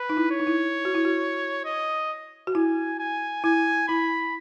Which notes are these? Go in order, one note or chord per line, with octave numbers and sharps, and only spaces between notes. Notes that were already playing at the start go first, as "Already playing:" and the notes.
Already playing: B4
D#4
E4
C#5
D#4
E4
F#4
E4
F#4
D#5
F#4
E4 G#5
G#5
E4 G#5
E4 B5